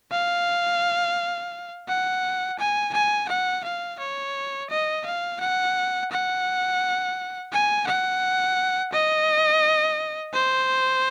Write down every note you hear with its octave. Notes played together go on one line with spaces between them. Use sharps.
F5
F#5
G#5
G#5
F#5
F5
C#5
D#5
F5
F#5
F#5
G#5
F#5
D#5
C5